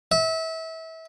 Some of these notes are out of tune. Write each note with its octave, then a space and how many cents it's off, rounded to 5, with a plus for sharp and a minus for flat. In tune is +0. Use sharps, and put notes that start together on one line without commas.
E5 -30